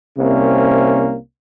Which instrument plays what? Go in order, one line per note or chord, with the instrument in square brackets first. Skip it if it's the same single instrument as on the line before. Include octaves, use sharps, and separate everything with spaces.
[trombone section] C2 C3 A#3 C#4